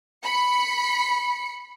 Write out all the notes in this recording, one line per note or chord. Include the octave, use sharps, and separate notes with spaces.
B5 C#7